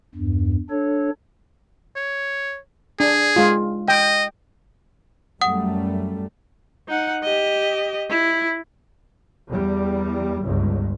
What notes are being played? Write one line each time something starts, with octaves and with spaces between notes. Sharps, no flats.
E2 G2
D4 A4 C#5
C#5
D4 G#4
G#3 F4
D#5 G5
F#2 G3 A3 F#5 D#6
D#4 F#5
G4 D#5
E4
E2 G3
G1 C#2 G2